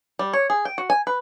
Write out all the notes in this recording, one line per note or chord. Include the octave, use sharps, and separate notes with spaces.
G3
C#5
G#4
G5
F#4
G#5
B4